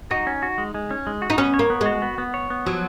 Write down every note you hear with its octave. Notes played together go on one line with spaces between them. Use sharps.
D#4 F#4
C#4
F#4
G#3
G#3
C#4
G#3
F#4
D#4
B3 C#4
C#5
A#3
B3
G#3 F#4
B3
B3
C#5
B3
F3 F#3